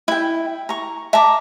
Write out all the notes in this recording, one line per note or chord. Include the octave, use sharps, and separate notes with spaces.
E4 G5
A#5 C#6
E5 A5 A#5 D6